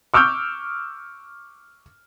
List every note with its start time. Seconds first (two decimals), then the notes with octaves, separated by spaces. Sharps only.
0.14 C#6 D6 E6 F6 G6